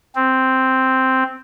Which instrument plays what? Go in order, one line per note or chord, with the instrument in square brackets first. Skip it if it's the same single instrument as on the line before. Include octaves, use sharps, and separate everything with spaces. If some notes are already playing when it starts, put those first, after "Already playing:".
[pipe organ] C4